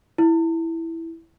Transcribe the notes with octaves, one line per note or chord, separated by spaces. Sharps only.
E4